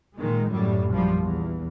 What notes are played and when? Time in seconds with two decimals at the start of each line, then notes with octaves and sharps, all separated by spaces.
0.16 A#2 D#3 G#3
0.50 F#2 A2 G3
0.92 A#1 F#2 F3 G3
1.22 E2